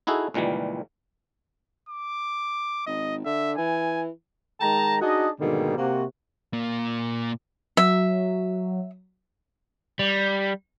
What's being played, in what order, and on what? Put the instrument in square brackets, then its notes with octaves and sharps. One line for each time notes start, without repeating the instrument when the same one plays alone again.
[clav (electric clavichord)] D#4 E4 F#4 G#4 A4
C#2 A#2 D#3 E3 G3
[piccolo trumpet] D6
[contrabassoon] G#1 [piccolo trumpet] D#5
[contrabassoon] D3 [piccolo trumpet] E5
[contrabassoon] E3 [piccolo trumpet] G#5
[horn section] D#3 G#3 G5 A5 A#5
D4 D#4 F#4 G#4 D#5
G#2 B2 D3 D#3 G3 A#3
C3 A#3 F#4
[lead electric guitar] A#2 A#3
[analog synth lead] F#3 [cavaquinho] E5
[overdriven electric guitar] G3